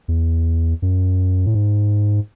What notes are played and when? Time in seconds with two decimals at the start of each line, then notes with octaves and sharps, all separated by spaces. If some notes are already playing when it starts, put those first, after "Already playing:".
0.08 E2
0.82 F#2
1.46 A2
1.54 G#2